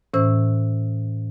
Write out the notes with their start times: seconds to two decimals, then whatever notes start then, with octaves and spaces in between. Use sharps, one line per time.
0.14 A2 E3 C#4 C5 E6